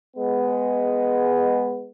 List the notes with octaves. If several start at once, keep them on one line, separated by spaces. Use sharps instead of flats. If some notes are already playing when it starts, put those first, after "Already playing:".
G#3 B3